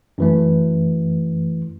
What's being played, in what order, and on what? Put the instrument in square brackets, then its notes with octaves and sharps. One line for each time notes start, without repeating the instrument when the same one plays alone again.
[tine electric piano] F#2 E3 A3